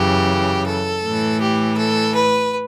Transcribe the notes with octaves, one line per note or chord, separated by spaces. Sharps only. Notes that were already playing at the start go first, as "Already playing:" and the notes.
Already playing: F#2 C#3 E3 G4
A4
A2 E3
G4
A4
B4